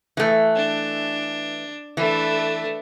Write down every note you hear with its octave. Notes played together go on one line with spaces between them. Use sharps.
E3 A3
D4
E3 A3 D4